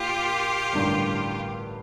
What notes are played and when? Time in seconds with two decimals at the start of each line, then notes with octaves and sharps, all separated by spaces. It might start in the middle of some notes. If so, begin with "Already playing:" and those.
Already playing: A#2 A#3 F4 G4
0.73 A1 G2 D3 G3 A#3